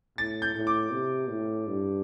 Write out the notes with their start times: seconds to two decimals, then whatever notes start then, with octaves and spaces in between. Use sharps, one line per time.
0.18 A2 A6
0.42 G6
0.55 A2
0.67 D6
0.92 C3
1.29 A2
1.67 G2